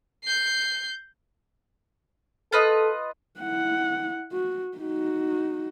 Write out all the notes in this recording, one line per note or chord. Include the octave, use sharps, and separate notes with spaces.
G6 C7
F4 A4 B4 D#5
E4 F#5
F#4
D#4 F#4